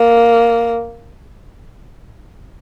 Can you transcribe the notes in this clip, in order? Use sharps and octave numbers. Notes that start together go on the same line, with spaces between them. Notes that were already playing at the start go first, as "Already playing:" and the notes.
Already playing: A#3